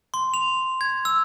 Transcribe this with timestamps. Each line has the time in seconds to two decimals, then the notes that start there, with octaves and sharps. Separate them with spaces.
0.14 C6
0.34 F7
0.81 G#6
1.05 E6